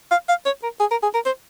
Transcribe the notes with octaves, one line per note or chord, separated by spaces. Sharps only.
F5
F5
C#5
A#4
G#4
A#4
G#4
A#4
C5